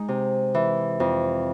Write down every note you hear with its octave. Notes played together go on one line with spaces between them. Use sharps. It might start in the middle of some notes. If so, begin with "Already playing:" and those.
Already playing: G#3 D#4
C3
E3
F2